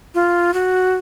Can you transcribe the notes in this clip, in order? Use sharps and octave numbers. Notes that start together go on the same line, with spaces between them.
F4
F#4